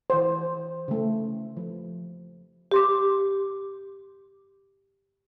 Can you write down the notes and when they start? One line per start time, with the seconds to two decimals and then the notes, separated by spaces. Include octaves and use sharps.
0.10 E3 C5
0.88 C#3 A3
1.57 F3
2.71 G4 C6 D6